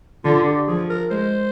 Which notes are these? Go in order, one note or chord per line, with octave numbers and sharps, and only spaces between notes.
D3 F4
G4
F3 G#4
A#4
G#3 C5